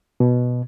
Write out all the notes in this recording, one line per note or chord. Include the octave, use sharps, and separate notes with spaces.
B2